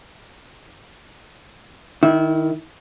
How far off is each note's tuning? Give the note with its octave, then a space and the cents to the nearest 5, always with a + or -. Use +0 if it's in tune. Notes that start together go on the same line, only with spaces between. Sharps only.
D#3 +0 E4 -25